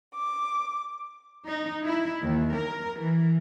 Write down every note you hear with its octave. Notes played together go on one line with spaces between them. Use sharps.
D6
D#4
E4
D#2
A#4
E3